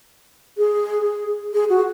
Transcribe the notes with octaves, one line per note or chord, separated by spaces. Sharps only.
G#4
G#4
F#4